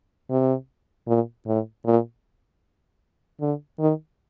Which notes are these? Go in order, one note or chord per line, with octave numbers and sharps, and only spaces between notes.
C3
A#2
A2
A#2
D3
D#3